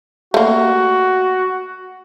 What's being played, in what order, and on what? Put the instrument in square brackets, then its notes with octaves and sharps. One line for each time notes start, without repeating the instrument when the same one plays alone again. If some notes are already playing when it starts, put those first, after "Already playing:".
[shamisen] A3 A#3 [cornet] F#4